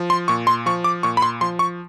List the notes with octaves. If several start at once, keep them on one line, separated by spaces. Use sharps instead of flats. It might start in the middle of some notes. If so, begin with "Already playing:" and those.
Already playing: F3
C6
A#2 C#6
C6
F3 C#6
D6
A#2 C#6
B5
C6
F3 C6
C#6